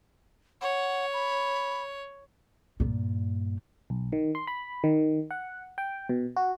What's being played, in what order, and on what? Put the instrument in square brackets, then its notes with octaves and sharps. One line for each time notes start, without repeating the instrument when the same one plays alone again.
[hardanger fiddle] C#5 [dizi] F#5
[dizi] B5
[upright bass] G2 A#2
[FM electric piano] B1
D#3
C6
B5
D#3
F#5
G5
B2
F#4